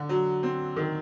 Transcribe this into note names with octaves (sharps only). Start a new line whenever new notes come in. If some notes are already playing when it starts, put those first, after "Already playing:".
Already playing: D3
F#3
C4
D#3